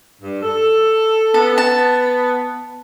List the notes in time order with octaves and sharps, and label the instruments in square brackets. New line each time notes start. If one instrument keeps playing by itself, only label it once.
[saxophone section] G2
A4
[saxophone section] B3 [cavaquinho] A4
[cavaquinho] A5